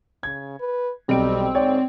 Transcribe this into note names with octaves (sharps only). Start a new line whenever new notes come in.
C#3 G#6
B4
B1 G3 C4 D7
G#2 C#5 D5 G5